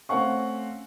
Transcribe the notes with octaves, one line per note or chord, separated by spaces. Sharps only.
A3 C4 C#4 F5 F#5 C#6